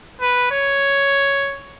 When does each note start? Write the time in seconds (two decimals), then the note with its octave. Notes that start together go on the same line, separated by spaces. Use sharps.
0.21 B4
0.52 C#5